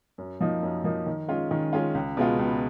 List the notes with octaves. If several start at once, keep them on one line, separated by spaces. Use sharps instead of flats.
F#2
F3 A#3 D#4
F#2
F3 A#3 D#4
D#3
G#3 C#4 F4
D#3
G#3 C#4 F4
C#2
B2 G#3 B3 F4
C#2